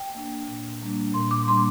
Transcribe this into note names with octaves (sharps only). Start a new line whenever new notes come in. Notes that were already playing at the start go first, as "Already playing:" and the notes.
Already playing: G5
A#3 D4
A#2
G3 A#3 D4
A#2 C6
D6
G3 A#3 D4 C6